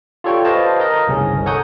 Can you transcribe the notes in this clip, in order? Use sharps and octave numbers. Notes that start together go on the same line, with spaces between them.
F4 G4 A4 C#5 D5 G5
B4 C5 D#5 F5 A5
A#4 D#5
G1 C2 C#3 C#4
A4 C#5 F#5 A#5 D#6 G6